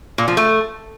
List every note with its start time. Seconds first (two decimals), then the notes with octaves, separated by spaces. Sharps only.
0.18 A#2
0.28 F3
0.37 A3